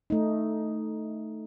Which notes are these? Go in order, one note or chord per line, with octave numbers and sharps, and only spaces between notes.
A3 D#4